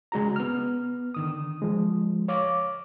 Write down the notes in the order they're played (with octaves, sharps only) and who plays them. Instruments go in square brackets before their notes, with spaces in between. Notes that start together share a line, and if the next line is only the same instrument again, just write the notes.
[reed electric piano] C#3 G#3 F#4 A#5
B3 F6
D3 D#3 D#6
F3 G#3
C#5 F5 D6